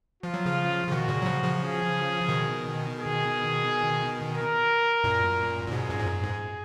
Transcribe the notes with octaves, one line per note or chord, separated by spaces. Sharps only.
F3 F4
F#3
C#3 F3
C#3
B2 D#3 F#4
A#2 C#3
F#3
C#3 F3
C#3 F3
G#4
B2 D#3
G#4
A#4
F#2 A#2
A#2
G#2 B2 G#4
F#2 A#2
G#2
F#2
G#2